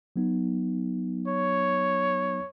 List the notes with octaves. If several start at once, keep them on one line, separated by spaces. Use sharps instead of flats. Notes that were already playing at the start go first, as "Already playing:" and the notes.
F#3 B3 D#4
C#5